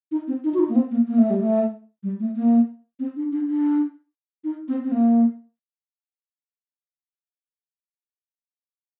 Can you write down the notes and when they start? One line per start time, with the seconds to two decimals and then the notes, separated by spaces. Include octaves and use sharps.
0.12 D#4
0.28 C4
0.44 D#4
0.54 F#4
0.59 D#4
0.69 A#3
0.76 C4
0.91 A#3
1.07 A#3
1.18 A3
1.30 G3
1.41 A3
2.03 G3
2.20 A3
2.36 A#3
3.00 C4
3.16 D4
3.32 D4
3.48 D4
4.44 D#4
4.68 C4
4.84 C4
4.92 A#3